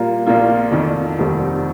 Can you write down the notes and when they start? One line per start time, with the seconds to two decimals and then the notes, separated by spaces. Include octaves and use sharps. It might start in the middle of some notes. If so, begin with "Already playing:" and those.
Already playing: A#2 G3 A#3 F4
0.26 A#1 A#2 A#3 F4
0.71 F1 F2 D#3
1.18 F1 D#2 D#3 G3 C4